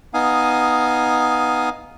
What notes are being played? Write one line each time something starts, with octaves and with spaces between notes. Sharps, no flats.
B3 D#4 F5 G#5 D#6